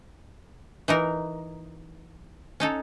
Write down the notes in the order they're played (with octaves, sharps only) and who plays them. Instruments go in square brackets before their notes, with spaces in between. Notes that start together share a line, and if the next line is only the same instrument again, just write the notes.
[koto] E3 D#4 A#4
C#4 D#4 A4